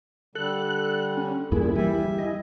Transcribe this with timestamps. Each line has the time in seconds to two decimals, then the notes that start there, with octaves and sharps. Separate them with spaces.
0.35 D3 G3 A4 F#6
1.17 C#4
1.52 E2 G2 A#2 E3 A#3 E4 G#4
1.76 E3 G3 E5 G#5
2.18 E4 D#5